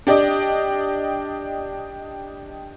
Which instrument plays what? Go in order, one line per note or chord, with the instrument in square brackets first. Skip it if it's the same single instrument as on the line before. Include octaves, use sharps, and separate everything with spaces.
[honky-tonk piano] D4 G4 D5 D#5